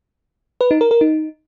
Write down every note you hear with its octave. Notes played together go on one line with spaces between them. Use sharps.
B4
D#4
A#4
A#4
D#4